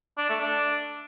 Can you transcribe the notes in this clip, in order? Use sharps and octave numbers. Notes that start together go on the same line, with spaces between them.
D4
A3
D4